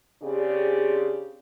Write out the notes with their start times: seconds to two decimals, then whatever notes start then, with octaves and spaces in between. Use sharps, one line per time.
0.23 C#3 C4 D4 G4 G#4 D5